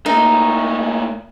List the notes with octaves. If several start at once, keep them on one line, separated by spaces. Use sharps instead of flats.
A#2 A3 D#4